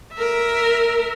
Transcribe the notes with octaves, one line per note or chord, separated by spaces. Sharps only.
A#4 E5